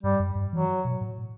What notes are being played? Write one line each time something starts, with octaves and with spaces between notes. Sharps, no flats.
G2 G3
F#2
G2
E3 F#3
B2
A2